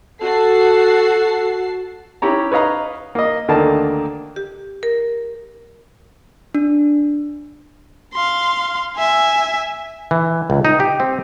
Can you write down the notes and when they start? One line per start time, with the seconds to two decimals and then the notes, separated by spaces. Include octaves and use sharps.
0.22 F#4 A4 A5 C7
2.22 C#4 E4 G4 C#5 A#5
2.52 B4 C#5 D#5 F5 A#5
3.15 A#3 D#5
3.48 D2 D3 D#3 A#3 A5
4.36 G4
4.83 A#4
6.55 D4
8.14 F5 C6
8.97 E5 G#5
10.11 E3
10.50 C#2
10.65 D#4
10.80 G4
11.00 C4